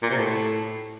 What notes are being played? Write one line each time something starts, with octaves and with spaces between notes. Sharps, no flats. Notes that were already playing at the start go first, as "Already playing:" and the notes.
A#2
C3
A2